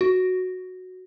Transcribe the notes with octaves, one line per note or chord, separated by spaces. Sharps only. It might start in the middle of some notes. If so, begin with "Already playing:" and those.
F#4